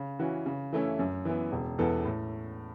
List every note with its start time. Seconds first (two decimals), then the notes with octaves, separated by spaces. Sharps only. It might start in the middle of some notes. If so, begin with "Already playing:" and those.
Already playing: C#3
0.19 E3 C#4 F#4
0.46 C#3
0.73 E3 A3 C#4 E4
0.99 F#2
1.25 E3 B3
1.52 E1
1.78 E2 E3 B3 A4
2.05 A2